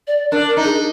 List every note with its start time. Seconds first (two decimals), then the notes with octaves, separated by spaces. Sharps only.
0.07 D5
0.31 D4 A#4
0.49 A#4
0.57 D#4
0.64 G#4